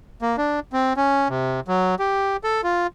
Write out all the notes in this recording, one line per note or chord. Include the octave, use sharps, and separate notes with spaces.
A#3
D4
C4
C#4
C3
F#3
G4
A4
F4